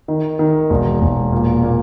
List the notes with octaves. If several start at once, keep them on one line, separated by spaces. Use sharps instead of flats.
D#3
D#3
E1
E1
A#2
A#2